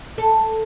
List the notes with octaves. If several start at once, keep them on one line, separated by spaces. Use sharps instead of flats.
A4